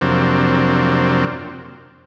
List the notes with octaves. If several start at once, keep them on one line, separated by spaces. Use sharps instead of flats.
F2 C3 F#3 A#3 C4 D4